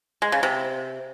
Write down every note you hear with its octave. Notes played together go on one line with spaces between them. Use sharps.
G#3
C#3
C3